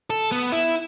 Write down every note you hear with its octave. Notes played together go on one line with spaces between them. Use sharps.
A4
B3
E4